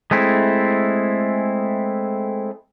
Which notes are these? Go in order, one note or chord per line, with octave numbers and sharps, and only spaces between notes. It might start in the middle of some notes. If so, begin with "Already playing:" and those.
G#3 A3 C4 E4